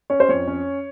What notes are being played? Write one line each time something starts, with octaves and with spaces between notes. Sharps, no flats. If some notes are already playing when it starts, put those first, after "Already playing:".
C#4 C#5
C5
F2 C#5
C#4